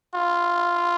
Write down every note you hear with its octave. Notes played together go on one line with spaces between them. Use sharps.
F4